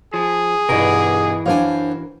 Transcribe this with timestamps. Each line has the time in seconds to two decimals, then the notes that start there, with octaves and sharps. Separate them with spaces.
0.14 F3 G#4
0.69 B1 G2 B2 E3 A#4
1.46 F#2 D4 C5 F5 G#5